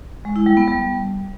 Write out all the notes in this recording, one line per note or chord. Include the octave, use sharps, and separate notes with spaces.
G#3
E4
G3
B3
G3